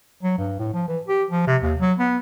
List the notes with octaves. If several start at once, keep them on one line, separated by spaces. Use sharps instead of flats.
F#3
G2
A2
F3
E3
G4
F3
C3
D#2
F#3
B3